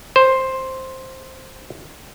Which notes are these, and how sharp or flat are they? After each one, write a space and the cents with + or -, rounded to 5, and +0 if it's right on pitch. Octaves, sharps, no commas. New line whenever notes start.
C5 +5